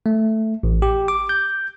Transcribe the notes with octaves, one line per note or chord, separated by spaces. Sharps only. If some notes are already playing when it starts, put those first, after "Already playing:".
A3
A1
G4
D6
G6